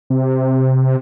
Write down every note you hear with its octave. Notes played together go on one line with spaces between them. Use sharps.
C3